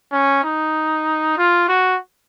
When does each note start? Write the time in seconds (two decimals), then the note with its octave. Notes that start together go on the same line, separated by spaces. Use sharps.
0.13 C#4
0.44 D#4
1.38 F4
1.69 F#4